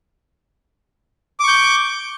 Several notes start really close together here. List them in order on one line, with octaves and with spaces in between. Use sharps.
D6 C#6 G6